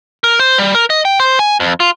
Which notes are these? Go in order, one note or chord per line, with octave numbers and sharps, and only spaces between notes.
A#4
C5
G3
A#4
D#5
G5
C5
G#5
F2
F4